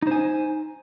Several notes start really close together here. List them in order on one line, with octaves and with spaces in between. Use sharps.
D#4 C5 G#5